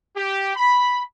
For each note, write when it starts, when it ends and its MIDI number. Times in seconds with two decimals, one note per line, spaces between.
0.17 0.55 67
0.56 1.01 83